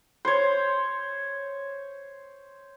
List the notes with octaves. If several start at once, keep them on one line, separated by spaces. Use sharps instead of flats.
C5 C#5